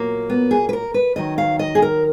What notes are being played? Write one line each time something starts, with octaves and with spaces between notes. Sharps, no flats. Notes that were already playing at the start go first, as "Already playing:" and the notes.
Already playing: A#2 F#3 A#3
B3
G#4
B4
A#4
B4
D#2 D#3 F#3 D#5
F5
D#5
G#4
A#4